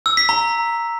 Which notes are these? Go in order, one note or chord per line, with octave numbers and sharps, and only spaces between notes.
E6
B6
A#5